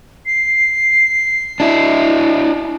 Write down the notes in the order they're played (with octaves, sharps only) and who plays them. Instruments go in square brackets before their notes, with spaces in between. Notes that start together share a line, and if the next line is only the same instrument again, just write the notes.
[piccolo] C7
[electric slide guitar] D4 E4